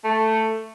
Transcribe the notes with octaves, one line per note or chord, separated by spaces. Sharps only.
A3